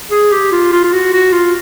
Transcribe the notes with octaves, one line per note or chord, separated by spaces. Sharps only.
G#4
G4
F4
F4
F4
F#4
F#4
F4